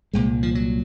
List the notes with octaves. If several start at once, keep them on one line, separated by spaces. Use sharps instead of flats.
C2 A#2 G#3
F3
F#3